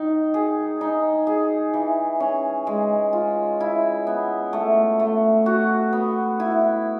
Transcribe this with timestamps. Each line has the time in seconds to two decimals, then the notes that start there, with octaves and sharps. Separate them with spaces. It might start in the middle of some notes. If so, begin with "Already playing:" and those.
Already playing: D#3 D#4
0.34 G#4
0.81 D#4
1.27 G#4
1.74 E3
2.20 C#4
2.67 G#3
3.13 F4
3.60 E4
4.07 B3
4.53 A3
5.00 A3
5.46 F#4
5.93 B3
6.40 E4